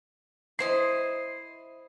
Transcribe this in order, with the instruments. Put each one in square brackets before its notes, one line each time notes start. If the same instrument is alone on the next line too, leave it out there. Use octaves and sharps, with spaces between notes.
[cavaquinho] E4 C5 D#5 [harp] C7